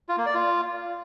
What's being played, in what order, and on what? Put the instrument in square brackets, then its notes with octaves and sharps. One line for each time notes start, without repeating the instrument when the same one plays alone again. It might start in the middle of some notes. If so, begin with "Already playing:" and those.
[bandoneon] F4
A#3
D5
F4